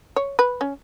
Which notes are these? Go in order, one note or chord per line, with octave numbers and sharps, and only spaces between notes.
C#5
B4
C#4